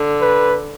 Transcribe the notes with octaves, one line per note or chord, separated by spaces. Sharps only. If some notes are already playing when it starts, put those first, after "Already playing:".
Already playing: D3
B4